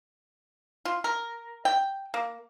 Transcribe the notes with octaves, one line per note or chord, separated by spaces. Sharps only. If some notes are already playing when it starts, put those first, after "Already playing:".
F4
A#4
G5
A#3